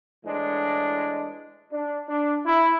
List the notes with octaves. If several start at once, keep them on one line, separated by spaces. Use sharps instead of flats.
A2 E3 G#3 D4
D4
D4
E4